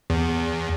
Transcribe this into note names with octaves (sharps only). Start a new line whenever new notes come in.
E2